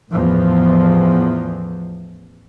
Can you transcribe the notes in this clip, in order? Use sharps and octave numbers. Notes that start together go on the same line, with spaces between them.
A1 E2 F3